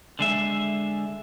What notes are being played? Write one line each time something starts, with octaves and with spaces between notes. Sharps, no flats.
D3 G#3 E5